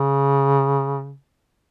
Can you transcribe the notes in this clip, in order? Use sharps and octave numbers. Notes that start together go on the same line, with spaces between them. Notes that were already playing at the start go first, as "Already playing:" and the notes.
Already playing: C#3